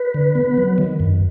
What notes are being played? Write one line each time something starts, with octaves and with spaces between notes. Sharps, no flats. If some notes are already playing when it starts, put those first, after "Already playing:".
Already playing: B4
D3
B3
F#3
D#3
F#2